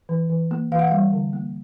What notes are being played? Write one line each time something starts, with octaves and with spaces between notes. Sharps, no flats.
E3
E3
A#3
E3 F5
F#5
G3 F5
D3
A#3